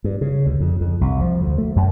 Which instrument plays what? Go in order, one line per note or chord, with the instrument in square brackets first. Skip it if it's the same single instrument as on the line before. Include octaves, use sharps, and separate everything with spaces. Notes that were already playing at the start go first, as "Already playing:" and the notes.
[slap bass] G2
C#3
D2
F2
F2
C2
F3
D2
A3
F#2